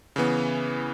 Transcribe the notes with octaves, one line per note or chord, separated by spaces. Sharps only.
C#3 E3 B3